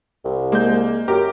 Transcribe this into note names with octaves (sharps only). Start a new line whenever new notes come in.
C2
G#3 A#3 G6
F#2 G4 A#4